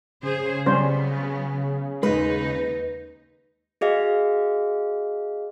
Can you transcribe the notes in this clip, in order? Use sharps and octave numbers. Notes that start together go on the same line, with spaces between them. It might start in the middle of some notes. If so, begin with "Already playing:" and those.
C#3 G#4 C5
F#3 G3 B3 C#4 C5
D#2 G#3 D#4 B4
F#4 G#4 D#5 F5